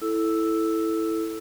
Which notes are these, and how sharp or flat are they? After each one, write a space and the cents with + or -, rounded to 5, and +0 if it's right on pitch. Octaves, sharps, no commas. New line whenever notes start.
E4 +0 A4 +0 E6 +0